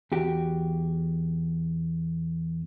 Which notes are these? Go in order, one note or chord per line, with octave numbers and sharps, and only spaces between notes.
E2 F#4 G4